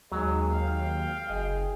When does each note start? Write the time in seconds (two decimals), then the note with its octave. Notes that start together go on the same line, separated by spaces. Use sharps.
0.12 D#2 F#3 G#3
0.52 F5 G5
0.99 F5
1.30 F#1 G#4 D#5